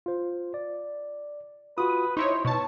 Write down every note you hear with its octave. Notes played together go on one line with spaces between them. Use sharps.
F4 C5
D5
F4 F#4 B4 D#6
D#4 E4 C5 C#5 C#6
B2 C#5 A5